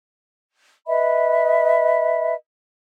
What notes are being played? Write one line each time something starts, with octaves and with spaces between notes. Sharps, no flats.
B4 D#5 E5 B5